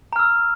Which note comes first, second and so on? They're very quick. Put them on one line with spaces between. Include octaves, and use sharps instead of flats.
A#5 F6 E6